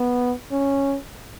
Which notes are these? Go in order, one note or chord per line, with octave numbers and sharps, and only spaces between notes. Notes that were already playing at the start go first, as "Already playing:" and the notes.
Already playing: B3
C#4